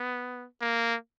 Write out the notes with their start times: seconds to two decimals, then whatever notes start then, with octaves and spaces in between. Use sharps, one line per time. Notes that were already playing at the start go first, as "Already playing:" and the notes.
Already playing: B3
0.62 A#3